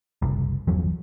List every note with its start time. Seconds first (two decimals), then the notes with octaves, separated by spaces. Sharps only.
0.22 F#1 C2
0.67 G1 E2 F3 F#3